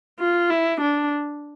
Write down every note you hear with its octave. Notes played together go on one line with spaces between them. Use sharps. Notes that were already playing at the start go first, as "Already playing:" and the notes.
F4
E4
D4